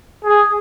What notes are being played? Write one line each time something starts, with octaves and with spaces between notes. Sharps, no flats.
G#4